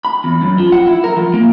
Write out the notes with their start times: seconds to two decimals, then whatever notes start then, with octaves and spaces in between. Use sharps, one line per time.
0.05 B5
0.24 E2
0.42 F#2
0.58 F3
0.72 F#5
0.87 E4
1.04 A#4
1.17 F3
1.34 A#3